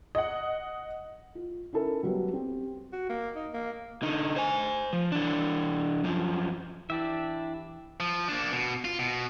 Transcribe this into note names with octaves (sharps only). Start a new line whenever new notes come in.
D#5 F#5
F4
C#4 D#4 E4 A4 A#4
F#3 G3 B3
C4 G4
F#4
A#3
D#4
A#3
D3 D#4
C5 G#5
F3
E3 D4
F#2 F3
E3 D4 E4 G4 E5
F3
A#3 D4
B2
F4
B2